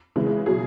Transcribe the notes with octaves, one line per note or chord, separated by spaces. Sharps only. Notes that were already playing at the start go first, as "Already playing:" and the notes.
C#3 E3 G#3
G#3
B2 F#3 G#4